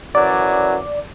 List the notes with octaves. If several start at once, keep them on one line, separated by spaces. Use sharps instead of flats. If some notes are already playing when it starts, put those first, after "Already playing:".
F#2 E3 F#3 D5